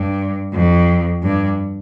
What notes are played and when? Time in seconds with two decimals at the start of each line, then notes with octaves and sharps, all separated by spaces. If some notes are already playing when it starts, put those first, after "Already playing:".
Already playing: G2
0.53 F2
1.23 G2